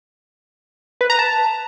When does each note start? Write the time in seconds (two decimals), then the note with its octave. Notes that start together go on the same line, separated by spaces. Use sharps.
1.01 B4
1.10 A#5
1.19 A5